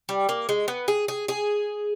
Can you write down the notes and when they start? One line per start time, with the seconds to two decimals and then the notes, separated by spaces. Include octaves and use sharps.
0.09 G3
0.29 A#3
0.49 G#3
0.68 B3
0.88 G#4
1.08 G#4
1.28 G#4